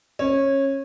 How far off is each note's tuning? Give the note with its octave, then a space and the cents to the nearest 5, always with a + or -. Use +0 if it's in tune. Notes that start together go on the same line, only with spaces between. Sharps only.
C#4 -20